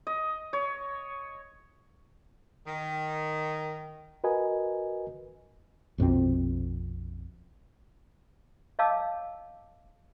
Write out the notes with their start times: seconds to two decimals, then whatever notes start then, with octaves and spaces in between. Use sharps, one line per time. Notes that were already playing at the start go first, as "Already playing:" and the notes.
0.07 D#5
0.53 C#5
2.67 D#3
4.24 F#4 A#4 B4 D#5 G#5
5.98 A#1 F2 B2 C4
8.79 C#5 D#5 F5 A5 D6 E6